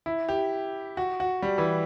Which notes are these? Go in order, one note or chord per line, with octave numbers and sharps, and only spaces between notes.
E4
G4
F#4
F#4
G3
E3